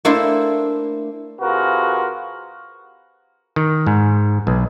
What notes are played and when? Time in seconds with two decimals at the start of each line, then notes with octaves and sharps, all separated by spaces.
0.05 A3 A#3 D4 E4 C5
1.40 C3 F4 F#4 G#4 A#4 B4
3.56 D#3
3.87 G#2
4.47 B1